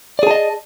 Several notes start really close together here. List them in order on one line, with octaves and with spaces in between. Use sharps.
D5 G#4 A5 D#5